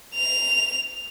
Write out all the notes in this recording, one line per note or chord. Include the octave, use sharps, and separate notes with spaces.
F7